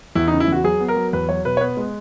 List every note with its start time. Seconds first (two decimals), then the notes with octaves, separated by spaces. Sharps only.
0.15 E2 E4
0.27 D#4
0.33 C#3
0.40 E4
0.48 E2 F#4
0.64 F#3 G#4
0.81 B3
0.88 A#4
0.97 F#3
1.13 E2 B4
1.29 F#3 C#5
1.45 B2 B4
1.57 C#5
1.61 B3 B4
1.77 G#3